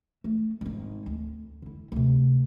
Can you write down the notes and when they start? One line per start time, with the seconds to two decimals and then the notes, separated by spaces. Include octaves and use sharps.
0.24 A3
0.61 G#1 D#4
1.06 D2
1.62 D3 E4
1.92 D2 C3